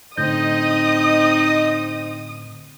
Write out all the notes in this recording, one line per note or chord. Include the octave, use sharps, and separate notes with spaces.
A2 D3 C4 D#4 D#5 D#6 G6